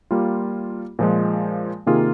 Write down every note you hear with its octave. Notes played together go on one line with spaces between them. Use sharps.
G3 A#3 F4
A#2 F3 G#3
C3 D#3 A#3 F4 G#4